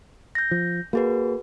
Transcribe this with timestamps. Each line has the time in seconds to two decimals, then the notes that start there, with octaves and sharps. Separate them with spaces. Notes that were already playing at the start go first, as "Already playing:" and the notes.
0.35 G6 A#6
0.51 F3
0.93 A#3 F#4 G#4 B4